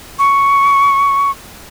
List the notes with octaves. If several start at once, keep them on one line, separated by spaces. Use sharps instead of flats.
C#6